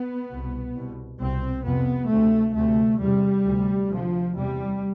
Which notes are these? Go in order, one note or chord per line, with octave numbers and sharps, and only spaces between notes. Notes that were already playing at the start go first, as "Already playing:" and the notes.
Already playing: B3
C2 B2
C2 B2
C2 B2 C4
F2 C3 B3
D2 C3 A3
D2 C3 A3
E2 C3 G3
D2 C3
D2 C3 F3
E2 C3 G3